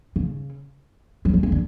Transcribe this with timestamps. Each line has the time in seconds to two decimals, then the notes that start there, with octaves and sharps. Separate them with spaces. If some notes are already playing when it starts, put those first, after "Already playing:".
0.16 C#3
1.25 F#3
1.34 F3
1.43 E3
1.52 D3